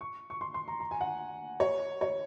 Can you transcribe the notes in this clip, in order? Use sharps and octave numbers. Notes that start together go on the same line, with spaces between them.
C#6
C#6
C6
C6
A#5
A#5
G#5
F#5
C#5
C#5